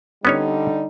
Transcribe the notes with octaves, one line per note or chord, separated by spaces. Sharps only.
D3 G3 B3 C#4 D#4 C#5